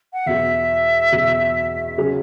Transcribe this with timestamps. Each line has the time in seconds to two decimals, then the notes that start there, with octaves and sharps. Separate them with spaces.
0.13 F#5
0.26 E2 B2 F#3 E5
1.12 E2 B2 F#3
1.98 C#3 F#3 C#4